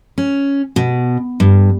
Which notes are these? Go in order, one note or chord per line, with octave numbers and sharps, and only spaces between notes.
C#4
B2
G2